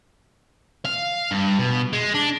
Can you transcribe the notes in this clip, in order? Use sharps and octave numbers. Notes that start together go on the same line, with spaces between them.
F5
G2
B2
G#3
D4